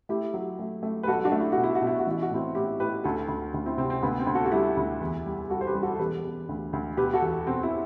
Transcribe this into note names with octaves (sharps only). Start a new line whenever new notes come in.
A3 E4 G4
F#3
A3
A3
B4
B1 F#4 A4
D4 F#4
A3
E4
B2 F#4
E4
F#4
B2
E4
F#4
A1 E4
F#4
A2 C4 E4
A2 E4 G4
A2 G4 B4
D2 F#4 A4
D2
D2
C4 E4
C3 C4
C4
D2 B3
C4
D2
F#4 A4
F#4
G3 E4 G4
D2
E2
G3
G3 F#4 A4
C5
G4 B4
G3
F#4 A4
A4
E1 G4 B4
E1
D2
D2
B2 G4 B4
F#4 A4
E2
B2 C4
C4 E4